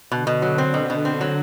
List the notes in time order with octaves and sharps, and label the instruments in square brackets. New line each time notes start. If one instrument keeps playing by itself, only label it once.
[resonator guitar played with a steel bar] B2 [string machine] D3
[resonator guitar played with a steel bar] B2
F#3
C4
B2
B2
C4
F#3